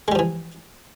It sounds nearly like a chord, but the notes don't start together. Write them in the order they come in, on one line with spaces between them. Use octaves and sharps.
G#3 G3 F3 E3